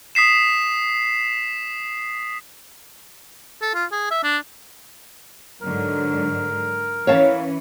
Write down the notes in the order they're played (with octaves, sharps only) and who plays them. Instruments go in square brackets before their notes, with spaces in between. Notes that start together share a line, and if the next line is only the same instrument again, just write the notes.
[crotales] D#6 B6 C7 E7
[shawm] A4
F4
G#4
E5
D4
[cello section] G#2 D3 F#3 [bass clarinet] A#4
[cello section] E3 C#4 [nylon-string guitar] C#5 F5 A5